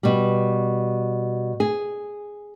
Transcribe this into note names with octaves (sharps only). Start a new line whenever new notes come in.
B2 G3
G#4